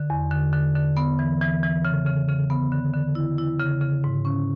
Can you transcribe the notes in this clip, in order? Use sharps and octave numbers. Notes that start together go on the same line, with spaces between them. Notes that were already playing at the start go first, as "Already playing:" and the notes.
Already playing: D3
E2
D3
D3
D3
B3
E3
E3
E3
C#3
C#3
C#3
B3
D3
D3
E4
E4
C#3
C#3
G#2
C#4